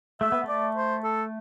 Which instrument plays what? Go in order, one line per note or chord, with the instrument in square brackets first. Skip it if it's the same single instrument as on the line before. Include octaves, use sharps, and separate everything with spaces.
[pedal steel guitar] A3 [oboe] E5
[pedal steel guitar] B3
[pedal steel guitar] A3 [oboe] D5
[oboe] C5
A4